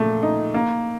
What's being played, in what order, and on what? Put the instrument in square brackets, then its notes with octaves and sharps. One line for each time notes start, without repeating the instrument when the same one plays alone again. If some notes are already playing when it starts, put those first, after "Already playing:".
Already playing: [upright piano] A#2 A3
D#4
A#3